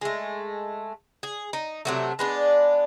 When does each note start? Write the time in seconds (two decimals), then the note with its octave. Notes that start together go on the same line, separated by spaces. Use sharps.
0.01 G#3 A3
1.23 G#4
1.53 D#4
1.85 C3 F#3 A3
2.19 G#3 B3 D4